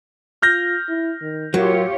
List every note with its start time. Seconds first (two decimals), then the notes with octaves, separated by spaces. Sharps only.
0.42 F4 F6 G6 A#6
0.88 E4
1.22 D#3
1.54 F#3 F4 G4 A#4 C#5